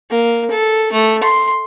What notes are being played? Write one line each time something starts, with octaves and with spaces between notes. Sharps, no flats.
A#3
A4
A3
C6